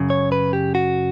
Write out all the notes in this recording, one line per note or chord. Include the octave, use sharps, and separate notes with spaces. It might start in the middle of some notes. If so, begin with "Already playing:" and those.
Already playing: F#2 C#3
C#5
B4
G4
F#4